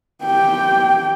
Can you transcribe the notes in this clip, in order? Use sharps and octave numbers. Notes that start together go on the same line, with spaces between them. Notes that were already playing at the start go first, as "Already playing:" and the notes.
G4 G5